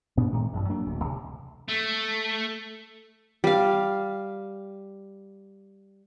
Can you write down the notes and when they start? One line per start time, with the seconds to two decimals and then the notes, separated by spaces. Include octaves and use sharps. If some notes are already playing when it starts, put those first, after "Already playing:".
0.17 A#2 B3 D4
0.32 A2 D#3 G#3 A3
0.53 A1 F#2
0.69 F#3 A#3 D4
0.86 D1 D2
1.04 C2
1.69 A3
3.44 G3 F5